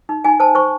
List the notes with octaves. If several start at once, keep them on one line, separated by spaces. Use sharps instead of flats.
D#4
D#4 G#5
C5 A5
C5 C#6